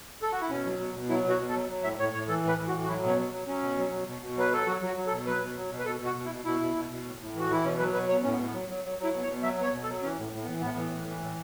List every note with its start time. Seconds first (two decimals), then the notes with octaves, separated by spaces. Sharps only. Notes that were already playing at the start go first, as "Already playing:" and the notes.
0.22 A4
0.32 F#4
0.42 E4
0.50 B2 C#4
0.65 F#3
0.79 B2
0.94 B2
1.09 F#3 E4
1.24 B2
1.30 F#4
1.39 B2
1.49 A4
1.55 F#3
1.69 F#3
1.83 A2 E5
1.99 A2 C#5
2.13 A2 C#5
2.28 E3 A4
2.44 A2 B4
2.59 E3
2.68 F#4
2.73 A2
2.84 F#4
2.88 F#3 E4
3.03 B2
3.08 C#4
3.19 F#3
3.33 F#3
3.47 F#3 C#4
3.62 B2
3.78 F#3
3.93 B2
4.08 B2
4.22 B2
4.37 F#3 B4
4.51 F#3 A4
4.67 F#3 F#4
4.82 F#3 F#4
4.96 F#3
5.07 A4
5.11 B2
5.27 F#3 B4
5.41 B2
5.56 F#3
5.70 B2
5.79 B4
5.86 B2 A4
6.00 B2
6.06 F#4
6.15 B2
6.25 E4
6.31 B2
6.45 B2 E4
6.61 B2
6.75 B2
6.90 B2
7.05 A2
7.20 A2
7.35 E3 F#4
7.50 E3 E4
7.65 B2 C#4
7.79 F#3 B4
7.94 B2 B4
8.09 B2 C#5
8.24 A2 C#4
8.32 B3
8.39 A2
8.47 B3
8.54 F#3
8.69 F#3
8.84 F#3
8.99 F#3
9.04 E4
9.14 B2
9.23 C#5
9.28 B2
9.43 F#3 E5
9.58 B2 C#5
9.73 B2
9.83 A4
9.89 F#3
10.02 E3 C#4
10.18 A2
10.33 A2
10.43 B3
10.48 E3
10.61 A2 B3
10.77 E3
10.92 A2
11.07 E3
11.21 A2